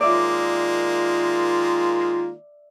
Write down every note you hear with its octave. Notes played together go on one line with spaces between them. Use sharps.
D#3 G#3 A#3 F4 D5 E5